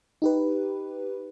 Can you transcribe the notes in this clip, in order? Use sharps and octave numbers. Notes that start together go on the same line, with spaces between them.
D#4 G4 B4